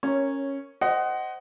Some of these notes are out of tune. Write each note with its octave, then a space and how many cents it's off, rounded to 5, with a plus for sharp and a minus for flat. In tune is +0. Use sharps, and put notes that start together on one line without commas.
C#4 -10 A#4 -10 C#5 +0
C5 +0 D#5 +0 F#5 +25